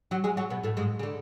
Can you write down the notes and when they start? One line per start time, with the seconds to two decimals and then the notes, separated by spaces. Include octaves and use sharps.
0.11 F#3 F#4
0.24 G#3 G#4
0.37 F#3 F#4
0.50 B2 B3
0.64 A2 A3
0.77 G#2 G#3
0.99 C#3
1.03 D3